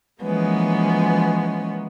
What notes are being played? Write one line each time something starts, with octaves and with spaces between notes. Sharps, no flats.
E3 F3 G#3 A#3 B3 C#4